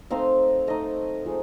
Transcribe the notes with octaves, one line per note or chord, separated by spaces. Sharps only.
A3 C4 D#4 F5
A3 C4 D#4 D#5
F3 G#3